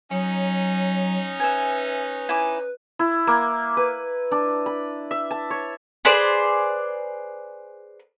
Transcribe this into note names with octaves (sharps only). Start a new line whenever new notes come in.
F#3 C#4 D#4
B4 E5 G#5
E4 G#5 D6
E4
A#3
B4
D4
B5
E5
A5
C#5
G#4 B4 C5 D5